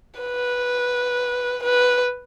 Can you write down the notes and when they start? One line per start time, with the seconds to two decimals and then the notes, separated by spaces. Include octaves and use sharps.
0.20 B4
1.63 B4